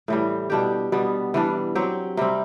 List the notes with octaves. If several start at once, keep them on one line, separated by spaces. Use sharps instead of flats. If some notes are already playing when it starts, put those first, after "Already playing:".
A2 E3 G3
B2 G3 D4 G4
B2 G3 B3
E3 G3 D4
F#3 C4 G4
C3 G3 C4